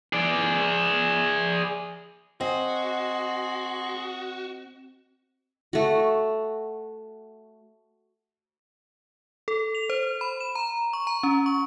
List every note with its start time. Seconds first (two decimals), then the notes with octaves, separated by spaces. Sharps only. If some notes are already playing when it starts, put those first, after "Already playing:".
0.13 G#4 D5
2.41 C4 F#4 G#4 D#5 C6
5.73 A3 F#4
9.48 A4
9.75 F7
9.90 C5
10.21 B5
10.41 E7
10.55 A#5
10.93 C#6
11.07 A#5
11.23 C#4
11.46 C#6